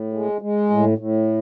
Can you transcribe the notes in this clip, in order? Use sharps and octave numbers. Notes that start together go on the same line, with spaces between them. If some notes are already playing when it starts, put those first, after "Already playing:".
Already playing: A2
G#3
G#3
A2
A2